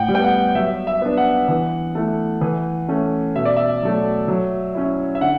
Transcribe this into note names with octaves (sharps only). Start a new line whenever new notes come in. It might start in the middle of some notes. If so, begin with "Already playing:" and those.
Already playing: A2 F#5 G5
G3
B3 G5
F#5
F#3 E5
E5
B3 D4
F#5
E3
A3 E4
E3
A3 C#4
B2 E5
D5
E5
F#3 A3
F#3
C#4 E4
E5
D3 F#5